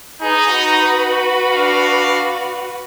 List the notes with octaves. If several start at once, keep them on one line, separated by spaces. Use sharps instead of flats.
D#4 G#4 B4
F#4 B4
D4 F5